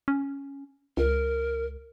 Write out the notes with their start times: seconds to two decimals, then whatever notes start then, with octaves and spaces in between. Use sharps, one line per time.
0.08 C#4
0.97 C#2 A#4